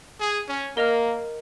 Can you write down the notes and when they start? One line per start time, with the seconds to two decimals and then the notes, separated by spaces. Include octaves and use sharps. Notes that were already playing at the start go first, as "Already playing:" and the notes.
0.20 G#4
0.49 C#4
0.76 A#3 A#4 D#5 A#5 F6